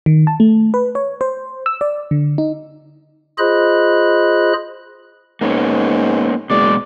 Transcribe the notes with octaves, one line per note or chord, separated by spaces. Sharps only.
D#3
A5
A3
B4
C#5
C5
E6
D5
D3
D#4
F4 G#4 C5 D#5 B5 F#6
G#2 A#3 B3 C#4
F#1 B2 G#3 D5